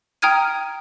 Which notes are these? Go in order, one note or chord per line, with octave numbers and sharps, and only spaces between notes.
G5 A#5 D#6 F6 G#6 D#7